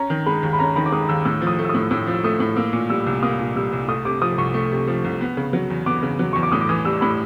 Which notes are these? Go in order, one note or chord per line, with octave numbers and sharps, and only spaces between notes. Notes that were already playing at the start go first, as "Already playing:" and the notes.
Already playing: C#4 A#5
D#3
G#3 B5
D#2
B5
C#4 A#5
D#3 B5
D6
G#3 D#6
D#2 E6
A2 E6
F3
D#6
A3
E6
D#6
A2
A2 E6
F3
E6
A3 D#6
A2
A#3 E6
A#2
G3 E6
C2
A#3 D#6
A#2
G3 E6
C2
A3 D#6
C3 D6
F3 D#6
C2 C#6
A3
C3
F3
C2
B3
C#3
F#3
E2
B3 D6
C#3
F#3
E2 C#6
D6
A2 D#6
D6
E3 D#6
G3 E6
A2 B5